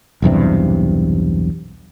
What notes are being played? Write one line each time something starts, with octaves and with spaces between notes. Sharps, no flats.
B1 E2 G2 C3